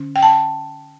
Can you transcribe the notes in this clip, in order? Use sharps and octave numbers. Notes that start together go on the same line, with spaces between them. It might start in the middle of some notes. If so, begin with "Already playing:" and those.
Already playing: D3 C#4
G5
A5